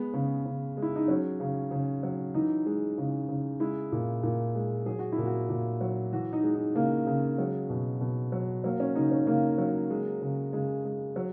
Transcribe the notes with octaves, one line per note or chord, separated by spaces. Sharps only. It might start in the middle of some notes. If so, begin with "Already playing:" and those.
Already playing: G#3 B3
C#3
C#3
G#3
E4
D#4
F#3 C#4
C#3
C#3
F#3
E3 D#4
G#3
C#3
C#3
G#3 E4
A#2
A#2
G#3
F#3 G#4
F#4
E4
A#2
F#4
A#2
F#3
E3 F#4
D#4
G#3
D#4
C#3 A#3
C#3
F#3 G#3
B2
B2
F#3
F#3 A#3
C#4
C#3 D#4
C#4
C#3 A#3
F#3
G#3
C#3
C#3 G#3
G#3
F#3